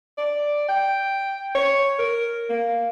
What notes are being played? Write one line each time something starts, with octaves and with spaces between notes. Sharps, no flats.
D5
G5
C#5
A#4
A#3